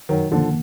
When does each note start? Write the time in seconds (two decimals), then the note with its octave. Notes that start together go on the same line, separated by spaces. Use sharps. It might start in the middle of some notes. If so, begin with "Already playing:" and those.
0.09 F#2 D#3 F#3
0.31 D3 D#3 F3 A#3